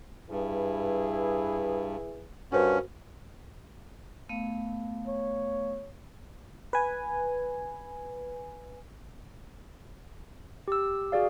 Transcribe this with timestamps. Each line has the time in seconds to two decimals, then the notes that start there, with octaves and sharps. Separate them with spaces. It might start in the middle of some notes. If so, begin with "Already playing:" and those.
0.30 G2 E4 G#4 B4
2.52 G2 C#4 F#4 A#4 C5
4.29 A3 B3 F5
5.07 C#5
6.73 B4 G#5
10.68 G4 E6
11.12 F#4 G#4 D5 F5